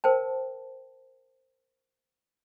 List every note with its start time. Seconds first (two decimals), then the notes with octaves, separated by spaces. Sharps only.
0.04 A#4 C5 G5 A5